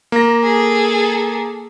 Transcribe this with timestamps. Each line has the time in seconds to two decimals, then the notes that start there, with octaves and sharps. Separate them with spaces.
0.12 A#3 A#6
0.43 G#4 A4